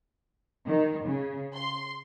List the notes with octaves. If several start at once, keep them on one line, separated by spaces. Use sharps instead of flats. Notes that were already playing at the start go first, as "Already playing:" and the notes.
D#3
C#3
C6